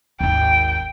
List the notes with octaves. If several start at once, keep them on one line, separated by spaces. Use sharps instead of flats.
G#1 D#2 G5